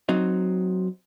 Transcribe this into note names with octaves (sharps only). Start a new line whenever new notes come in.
F#3 C4 D#4